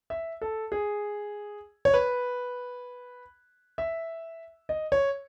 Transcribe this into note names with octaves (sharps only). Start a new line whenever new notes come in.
E5
A4
G#4
C#5
B4
E5
D#5
C#5